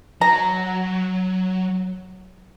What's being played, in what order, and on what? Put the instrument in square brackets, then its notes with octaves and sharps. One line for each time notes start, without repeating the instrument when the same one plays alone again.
[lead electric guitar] F#3 [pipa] A#5